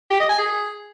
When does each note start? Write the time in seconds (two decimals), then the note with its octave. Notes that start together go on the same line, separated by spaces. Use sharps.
0.11 G4
0.20 D#5
0.29 G#5
0.39 G#4